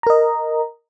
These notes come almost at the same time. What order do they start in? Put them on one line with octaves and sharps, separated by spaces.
A#5 A#4 D#5